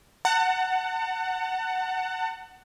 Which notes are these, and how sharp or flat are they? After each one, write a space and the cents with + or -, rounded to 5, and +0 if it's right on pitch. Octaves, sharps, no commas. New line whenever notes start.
F#5 +10 A5 +40